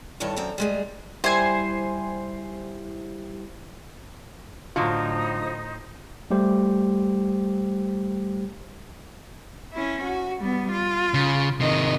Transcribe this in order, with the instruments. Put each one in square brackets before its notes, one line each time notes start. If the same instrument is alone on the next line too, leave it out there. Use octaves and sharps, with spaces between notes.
[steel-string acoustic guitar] G2 D#3 E3 A4 C#5
F#2 C4 A#5
G3 G#3 G#4
[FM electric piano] G3 E4 G4 [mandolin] C5 G#5
[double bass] A2 [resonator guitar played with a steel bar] D3 F#3 [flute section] D#4 C5 [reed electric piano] F4
[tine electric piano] G3 A3 G4 C5
[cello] C#4 E4
F#4
G3 B3
F4
[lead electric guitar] C#3
[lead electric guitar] C3 D#3 [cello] D#5